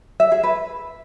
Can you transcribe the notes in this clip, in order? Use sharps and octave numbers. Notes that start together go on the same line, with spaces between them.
E5
G#4
B4